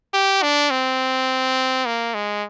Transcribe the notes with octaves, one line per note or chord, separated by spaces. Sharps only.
G4
D4
C4
A#3
G#3